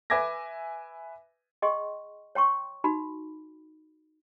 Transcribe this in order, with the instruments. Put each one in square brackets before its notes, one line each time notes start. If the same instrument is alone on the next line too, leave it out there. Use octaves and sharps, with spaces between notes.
[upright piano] B4 E5 G#5 D6 G#6 A#6
[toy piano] G#4 D#5 G5 C6 C#6
C#5 G5 C6 C#6
D#4 F#4 B5